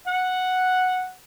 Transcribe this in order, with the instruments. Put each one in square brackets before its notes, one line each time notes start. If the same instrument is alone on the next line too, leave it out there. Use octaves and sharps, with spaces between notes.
[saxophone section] F#5